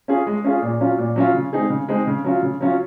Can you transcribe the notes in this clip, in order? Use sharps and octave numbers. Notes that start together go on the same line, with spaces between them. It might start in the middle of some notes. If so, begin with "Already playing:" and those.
C#4 F4 G#4
G#3
C#4 F4 G#4
A#2
F#3 C#4 F4
A#2
F#3 C#4 F4
C#3
G#3 C4 D#4 G#4
C#3
G#3 C4 D#4 G#4
C#3
F#3 C#4 F4
C#3
F#3 C#4 F4